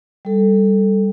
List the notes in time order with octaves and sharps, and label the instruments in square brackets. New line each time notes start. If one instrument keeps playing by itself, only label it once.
[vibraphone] G3 A4